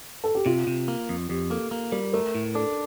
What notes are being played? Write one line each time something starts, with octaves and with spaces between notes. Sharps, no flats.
A4
G4
C3 F4
C3
A#3
F2
F2 G4
A#3 A4
A#3
G3 A#4
A3 A#4
A2
D4 A4